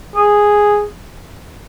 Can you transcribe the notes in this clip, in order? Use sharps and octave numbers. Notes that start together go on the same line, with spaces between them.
G#4